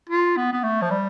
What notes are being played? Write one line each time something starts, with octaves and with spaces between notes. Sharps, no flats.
F4
B3
B3
A3
F3
G3